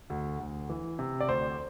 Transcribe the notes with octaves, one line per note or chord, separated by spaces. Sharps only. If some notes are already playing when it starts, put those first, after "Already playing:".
D2
D2
E3
C3
D5
D2 C5